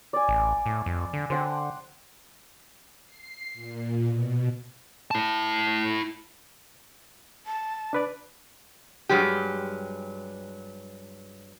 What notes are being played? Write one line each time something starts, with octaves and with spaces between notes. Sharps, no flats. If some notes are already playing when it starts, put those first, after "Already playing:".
D5 G#5
A1
A2
F2
D3
D3 C5 F#5 G5
C7
A#2
B2
E4 A5
A5
D4 B4 D5
G2 F#3 G#3 G4